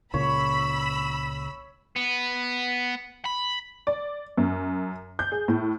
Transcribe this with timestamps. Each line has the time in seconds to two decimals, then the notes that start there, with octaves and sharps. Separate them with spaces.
0.14 C#2 A#2 C#3 C#5 B5 E6
1.96 B3
3.25 B5
3.87 D5
4.37 F#2
5.19 G6
5.32 G#4
5.48 A2